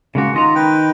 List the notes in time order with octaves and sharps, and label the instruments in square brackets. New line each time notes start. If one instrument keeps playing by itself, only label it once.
[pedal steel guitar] C#3 G#3 F#4 [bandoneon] A#3
[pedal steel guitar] D#3 D#5 A#5 [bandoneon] F4
[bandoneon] B4 G5